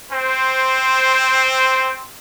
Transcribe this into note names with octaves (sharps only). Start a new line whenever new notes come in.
C4 C5